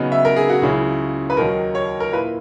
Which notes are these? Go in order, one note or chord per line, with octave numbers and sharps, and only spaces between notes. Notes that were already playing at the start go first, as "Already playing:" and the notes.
Already playing: C#3 F#3 B3 D#4
E5
A#4
G#4
F#4
C#2 C#3 F#3 C#4 E4 G#4
B4
D#2 D#3 F#3 A#4
C#5
A#4
A#2 A#3 E4 B4